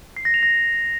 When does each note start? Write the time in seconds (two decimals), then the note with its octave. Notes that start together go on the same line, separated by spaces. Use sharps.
0.17 C7
0.25 A#6
0.34 F7
0.43 A#6